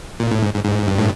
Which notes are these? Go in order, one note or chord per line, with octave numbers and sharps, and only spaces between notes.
A#2
A2
G#2
G#2
G#2
G2
A2